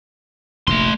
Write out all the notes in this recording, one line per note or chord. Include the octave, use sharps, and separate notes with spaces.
F1 A#1 A3 C6